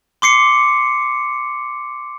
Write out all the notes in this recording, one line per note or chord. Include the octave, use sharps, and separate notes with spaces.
C6 D6 C7 C#7